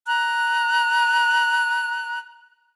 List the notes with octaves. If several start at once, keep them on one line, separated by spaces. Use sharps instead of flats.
A#5 F#6